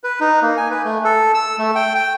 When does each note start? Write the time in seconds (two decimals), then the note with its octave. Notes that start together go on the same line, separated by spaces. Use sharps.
0.04 B4
0.20 D#4
0.42 A#3
0.57 G#5
0.71 B4
0.85 A3
1.04 A4
1.34 E6
1.59 A3
1.76 G5
1.95 G5